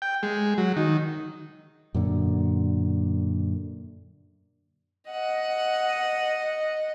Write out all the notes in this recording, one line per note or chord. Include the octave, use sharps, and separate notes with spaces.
G5
G#3
F#3
D#3
F#2 A#2 D3
D#5 F#5